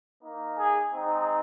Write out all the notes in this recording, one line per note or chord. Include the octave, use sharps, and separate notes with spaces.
A#3 D#4
G#4
G#3 C4 D#4